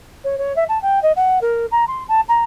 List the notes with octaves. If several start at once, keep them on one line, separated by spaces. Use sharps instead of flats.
C#5
C#5
E5
A5
G5
D#5
F#5
A#4
A#5
C6
A5
A#5